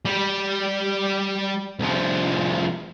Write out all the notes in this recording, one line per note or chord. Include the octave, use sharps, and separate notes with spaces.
G3 G4
C2 F3